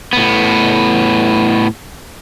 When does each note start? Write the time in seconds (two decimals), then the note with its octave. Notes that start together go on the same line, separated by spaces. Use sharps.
0.13 A2 B3